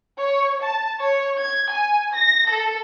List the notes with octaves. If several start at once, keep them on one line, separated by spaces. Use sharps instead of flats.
C#5
A5
C#5
G#6
G#5
A#6
A4